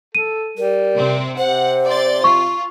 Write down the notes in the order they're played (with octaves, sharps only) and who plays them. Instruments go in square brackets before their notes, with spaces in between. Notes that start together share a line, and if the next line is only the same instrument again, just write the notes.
[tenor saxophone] A4 [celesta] D#7
[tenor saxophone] G3 [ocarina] A#4
[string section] C3 C4
[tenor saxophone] C3 [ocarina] C5 [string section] F#5
[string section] D5 C6 A6
[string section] F4 [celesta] C#6